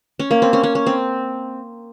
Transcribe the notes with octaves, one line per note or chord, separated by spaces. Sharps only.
C#4
A#3
C4
C#4
C#4
C#4
C4